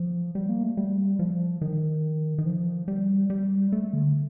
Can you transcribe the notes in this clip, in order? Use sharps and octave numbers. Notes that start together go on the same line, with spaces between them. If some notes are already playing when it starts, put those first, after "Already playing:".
Already playing: F3
G3
A#3
A3
G3
F3
D#3
D#3
F3
G3
G3
A3
D3